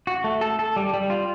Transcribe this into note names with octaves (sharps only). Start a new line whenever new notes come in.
F#4
A3
A4
A4
G3
G3
F4